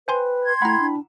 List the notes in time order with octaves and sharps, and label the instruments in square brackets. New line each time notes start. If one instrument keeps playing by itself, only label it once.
[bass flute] B4 [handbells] C5 G#5 C6 [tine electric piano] G5
[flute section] C6 G#6
[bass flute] A3 [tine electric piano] E4 G5 B5 [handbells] F#5 A#5
[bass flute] D4